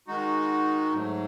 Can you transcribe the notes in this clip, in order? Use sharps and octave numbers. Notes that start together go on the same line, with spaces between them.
D#3 G#3 D#4 F#4
G#2 F#3 A3